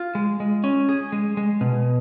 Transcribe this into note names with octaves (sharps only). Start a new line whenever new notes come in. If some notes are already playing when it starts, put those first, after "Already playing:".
Already playing: F4
G#3
G#3
C#4
G#4
G#3
G#3
B2